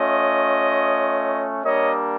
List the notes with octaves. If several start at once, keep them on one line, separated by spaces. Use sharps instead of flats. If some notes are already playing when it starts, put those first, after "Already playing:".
Already playing: A3 C#4 F4 C#5 D#5
G3 A#3 D4 C#5 D#5